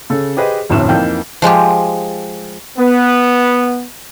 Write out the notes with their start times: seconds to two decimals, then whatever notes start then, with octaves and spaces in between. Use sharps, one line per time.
0.10 C#3 A4
0.37 G4 G#4 B4 C5 D#5
0.70 F1 D2 A2 D3 C#4 E7
0.89 F2 E3 A#3 D#4 G5 G6
1.42 F3 G#3 F4 G4
2.78 B3